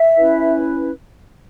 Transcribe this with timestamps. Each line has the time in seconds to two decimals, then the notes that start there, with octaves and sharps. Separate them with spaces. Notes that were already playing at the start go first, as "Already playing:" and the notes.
Already playing: E5
0.17 C#4 E4 B4